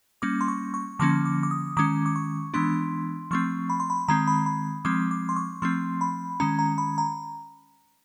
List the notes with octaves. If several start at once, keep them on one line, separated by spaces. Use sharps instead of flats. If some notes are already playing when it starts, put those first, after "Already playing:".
G3 A#3 C#4 D6
C6
C#6
C#6
D3 F3 A#3 C#4 D6
D6
D6
D#6
D#3 G#3 C#4 D6
D6
C#6
E3 G#3 B3 D4 C6
F3 A3 C4 C#6
B5
C6
B5
D#3 G#3 C4 A#5
B5
B5
F3 G#3 C4 D6
D6
C6
C#6
F3 A3 C4 C6
B5
D#3 G#3 C#4 A#5
A#5
B5
A#5